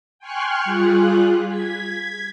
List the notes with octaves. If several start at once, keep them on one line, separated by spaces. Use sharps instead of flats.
G5 G#5 C6 C#6 F6 F#6
G3 F4 G#4 F#6
G#6 B6